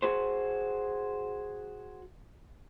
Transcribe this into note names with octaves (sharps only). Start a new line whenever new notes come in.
F#4 G#4 C5